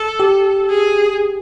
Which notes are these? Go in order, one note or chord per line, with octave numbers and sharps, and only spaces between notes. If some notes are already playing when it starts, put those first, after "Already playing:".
Already playing: A4
G4
G#4